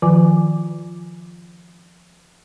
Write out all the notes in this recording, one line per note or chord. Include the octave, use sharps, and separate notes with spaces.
D#3 F3 F4 G#5 D6